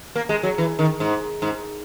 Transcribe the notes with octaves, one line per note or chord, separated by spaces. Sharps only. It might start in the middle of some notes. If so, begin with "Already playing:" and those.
A#3
G#3
F#3
E3
D#3
G#2
G#2